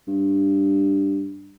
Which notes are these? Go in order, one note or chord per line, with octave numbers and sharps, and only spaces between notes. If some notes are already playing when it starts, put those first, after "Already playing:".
G2